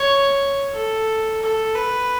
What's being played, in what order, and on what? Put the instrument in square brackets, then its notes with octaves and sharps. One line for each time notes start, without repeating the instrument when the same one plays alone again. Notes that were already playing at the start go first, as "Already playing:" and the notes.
Already playing: [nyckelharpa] C#5
A4
A4
B4